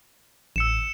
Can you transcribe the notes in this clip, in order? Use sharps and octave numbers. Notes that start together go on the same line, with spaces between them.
A1 E6 C#7 E7